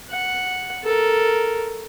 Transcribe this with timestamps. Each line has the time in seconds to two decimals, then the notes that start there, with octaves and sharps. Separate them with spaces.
0.11 F#5
0.84 A4 A#4